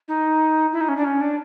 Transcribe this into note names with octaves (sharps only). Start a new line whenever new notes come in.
D#4
E4
D#4
C#4
D4
C#4
D4